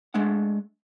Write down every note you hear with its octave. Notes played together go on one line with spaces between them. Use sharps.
G#3 A3 D4 F#5